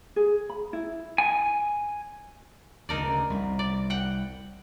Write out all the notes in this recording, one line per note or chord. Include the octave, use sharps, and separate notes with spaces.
G#4
B5
E4
G#5
D2 C#3 D#4 A#4 D5
C2 C3
D5
F#5 G5